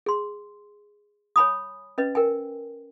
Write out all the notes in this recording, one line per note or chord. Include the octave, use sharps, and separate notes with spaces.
G#4 C6
C#5 G#5 B5 D#6
C#4 B4 D#5
A#4 G5 G#5